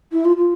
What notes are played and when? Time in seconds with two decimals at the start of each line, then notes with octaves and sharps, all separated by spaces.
0.12 E4
0.25 F4
0.37 F4